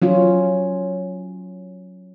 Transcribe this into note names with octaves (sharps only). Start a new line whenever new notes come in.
F#3 C#4 F4